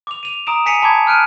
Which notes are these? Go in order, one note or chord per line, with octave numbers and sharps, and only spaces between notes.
D6 F7
D#7 F7
A#5 D#6 D7 E7
G#5 B6 C#7 D#7 F7
A5 B5 D6 G#6
F6 F#6 D7 D#7